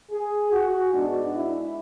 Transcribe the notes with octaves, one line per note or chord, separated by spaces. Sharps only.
G#4
F#4
G#2 G#3 B3 D4
E4